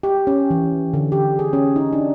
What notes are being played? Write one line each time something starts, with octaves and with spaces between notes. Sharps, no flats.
G4
C#4
E3
D3
G4
G#4
C#4
D#4
D4